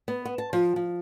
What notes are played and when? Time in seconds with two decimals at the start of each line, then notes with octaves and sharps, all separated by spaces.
0.08 B3
0.25 B3
0.38 A5
0.53 F3
0.76 F3